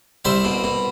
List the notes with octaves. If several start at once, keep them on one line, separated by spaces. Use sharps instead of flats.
C2 C5 E5
B2
B2